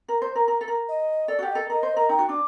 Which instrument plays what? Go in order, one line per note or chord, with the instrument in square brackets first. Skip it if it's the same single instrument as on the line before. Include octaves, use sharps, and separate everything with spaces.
[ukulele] A#4
C5
A#4
A#4
A4
A#4
[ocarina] D#5
[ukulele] A4 [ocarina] D5
[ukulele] F#4 G4 [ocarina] F#5
[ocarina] D#5
[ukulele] A4
[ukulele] A#4 [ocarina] D#5
[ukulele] C5
A#4
[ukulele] D#4 [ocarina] G5
[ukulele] F#4
[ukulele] D4 [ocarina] D6